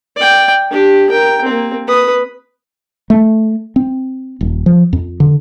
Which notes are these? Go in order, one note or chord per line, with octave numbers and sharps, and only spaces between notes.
D5 G5
D4 G4
A#4 G5
A#3 C4
B4 D#6
A3
C4
D#1
F3
F2
D3